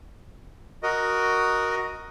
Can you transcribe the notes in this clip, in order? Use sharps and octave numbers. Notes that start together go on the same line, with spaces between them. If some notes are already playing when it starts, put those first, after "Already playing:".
F#4 A#4 D#5